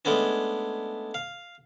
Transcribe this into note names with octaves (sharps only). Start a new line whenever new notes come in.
G#3 A3 B3 C#4 D4
F5